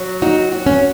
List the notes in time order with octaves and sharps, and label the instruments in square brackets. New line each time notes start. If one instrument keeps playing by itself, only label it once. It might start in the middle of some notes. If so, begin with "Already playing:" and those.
Already playing: [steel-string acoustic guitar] F#3
[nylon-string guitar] D#4 [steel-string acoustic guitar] F#4
[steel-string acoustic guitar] F#4
[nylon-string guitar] C#4